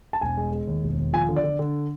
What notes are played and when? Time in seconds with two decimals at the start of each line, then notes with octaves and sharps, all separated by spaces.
0.13 A5
0.21 E1 G#5
0.37 G#3
0.52 G#3
0.67 D#2
0.83 E1
0.98 D#2
1.13 F3 G#5
1.29 D3
1.36 D5
1.44 D3
1.59 D3